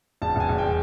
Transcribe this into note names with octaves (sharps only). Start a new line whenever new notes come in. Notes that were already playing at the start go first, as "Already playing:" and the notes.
E1 A5
E1 G#5
E1
G5